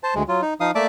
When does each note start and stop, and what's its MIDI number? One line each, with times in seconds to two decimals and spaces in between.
0.03 0.14 72
0.03 0.14 81
0.15 0.23 38
0.15 0.23 56
0.28 0.41 54
0.28 0.41 65
0.42 0.54 63
0.60 0.71 53
0.60 0.71 63
0.60 0.71 77
0.60 0.71 87
0.75 0.87 57
0.75 0.87 58
0.75 0.87 74
0.75 0.87 76
0.75 0.87 81
0.75 0.87 86